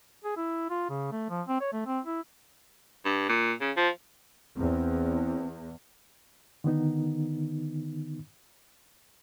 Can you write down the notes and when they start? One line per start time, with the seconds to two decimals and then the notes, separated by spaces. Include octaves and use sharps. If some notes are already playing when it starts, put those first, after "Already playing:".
0.25 G#4
0.37 E4
0.70 F4
0.90 C#3
1.12 A3
1.30 F3
1.48 C4
1.61 C#5
1.73 A3
1.87 C4
2.05 E4
3.05 G2
3.29 A#2
3.61 C#3
3.77 F3
4.56 E2 C4
6.64 D3 D#3 B3 D#4